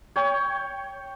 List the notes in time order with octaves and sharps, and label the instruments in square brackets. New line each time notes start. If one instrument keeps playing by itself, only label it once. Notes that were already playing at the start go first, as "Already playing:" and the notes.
[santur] C#5 G5